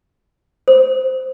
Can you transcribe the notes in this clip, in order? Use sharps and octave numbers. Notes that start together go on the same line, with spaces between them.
C5